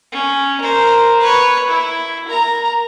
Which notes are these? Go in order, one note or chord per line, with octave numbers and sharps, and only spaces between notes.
C#4
A#4 C5
B4 C#5
E4
A#4 A#5